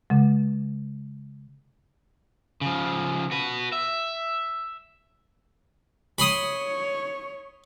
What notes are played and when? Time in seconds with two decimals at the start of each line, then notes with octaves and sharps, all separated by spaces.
0.10 C#3 G#3
2.61 C#3 F3
3.31 F#4 B4
3.72 E5
6.18 C#5 B5 C6 D#6